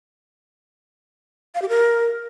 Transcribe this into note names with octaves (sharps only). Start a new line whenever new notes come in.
F5
G4
A#4